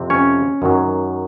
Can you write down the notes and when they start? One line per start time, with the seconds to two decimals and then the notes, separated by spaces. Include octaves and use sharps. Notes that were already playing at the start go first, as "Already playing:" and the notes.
Already playing: F2 C3 C4
0.10 C#4 C#5
0.62 F#2 D#3 F#3